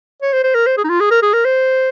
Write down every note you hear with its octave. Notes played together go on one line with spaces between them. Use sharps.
C#5
C5
C5
A#4
C5
G#4
D#4
F4
G#4
A#4
G#4
A#4
C5